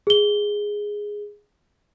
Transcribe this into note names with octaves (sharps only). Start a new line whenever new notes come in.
G#4 G7